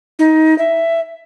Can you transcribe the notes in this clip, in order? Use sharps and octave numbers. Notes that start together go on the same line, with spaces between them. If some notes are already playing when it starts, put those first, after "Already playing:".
D#4
E5